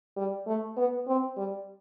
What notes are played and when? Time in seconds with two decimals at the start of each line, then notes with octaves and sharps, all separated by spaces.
0.17 G3
0.47 A3
0.77 B3
1.07 C4
1.37 G3